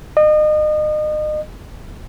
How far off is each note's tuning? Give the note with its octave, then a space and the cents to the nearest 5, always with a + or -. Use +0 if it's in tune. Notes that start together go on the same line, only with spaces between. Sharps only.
D#5 -35